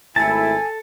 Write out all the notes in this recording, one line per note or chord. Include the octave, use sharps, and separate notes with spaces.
G#1 A3 E4 A4 G#5 A5